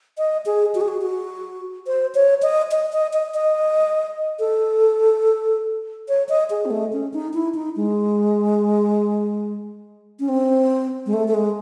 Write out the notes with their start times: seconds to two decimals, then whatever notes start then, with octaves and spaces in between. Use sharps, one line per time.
0.18 D#5
0.46 G#4
0.75 F#4
0.81 G#4
0.88 F#4
1.02 F#4
1.87 C5
2.15 C#5
2.43 D#5
2.71 D#5
2.93 D#5
3.13 D#5
3.34 D#5
4.39 A4
6.09 C#5
6.29 D#5
6.50 G#4
6.65 C4
6.71 A3
6.93 C#4
7.13 D#4
7.34 E4
7.55 D#4
7.76 G#3
10.20 C#4
10.29 C4
11.06 G#3
11.13 A3
11.28 A3
11.34 G#3